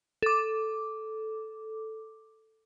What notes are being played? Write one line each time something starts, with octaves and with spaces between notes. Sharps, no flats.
A4 D6